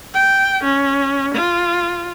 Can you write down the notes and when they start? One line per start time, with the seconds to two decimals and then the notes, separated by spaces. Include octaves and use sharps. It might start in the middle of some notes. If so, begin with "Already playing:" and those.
0.14 G5
0.64 C#4
1.34 F4